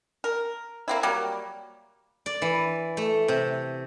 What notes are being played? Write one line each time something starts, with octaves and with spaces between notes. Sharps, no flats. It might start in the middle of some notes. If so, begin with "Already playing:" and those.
A#4
A#3 C4 E4
F#3 G3 A#3
D5
E3
A3
C3